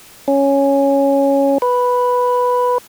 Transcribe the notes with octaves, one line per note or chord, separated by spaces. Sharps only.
C#4
B4